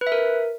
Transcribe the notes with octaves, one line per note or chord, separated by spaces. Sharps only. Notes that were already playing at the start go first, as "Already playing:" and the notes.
B4
E5
A#4